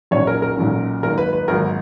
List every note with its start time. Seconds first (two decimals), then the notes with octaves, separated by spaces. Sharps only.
0.11 B1 A#2 F#3 C#4 C#5
0.27 A#4
0.42 A#4
0.57 B1 A#2 F#3 C#4
1.03 G#1 G#2 F#3 A#3 A#4
1.18 B4
1.33 B4
1.48 G#1 G#2 F#3 A#3 A#4